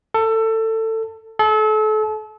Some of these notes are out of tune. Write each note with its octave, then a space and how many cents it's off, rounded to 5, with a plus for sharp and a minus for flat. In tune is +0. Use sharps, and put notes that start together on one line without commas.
A4 +20
A4 -35